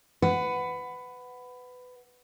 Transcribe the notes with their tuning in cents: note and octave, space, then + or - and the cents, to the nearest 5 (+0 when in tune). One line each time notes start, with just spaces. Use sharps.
B4 +20 F#5 +0